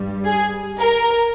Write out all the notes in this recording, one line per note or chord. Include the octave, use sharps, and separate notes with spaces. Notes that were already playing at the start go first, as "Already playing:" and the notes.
Already playing: G2 G3
G#4
A#4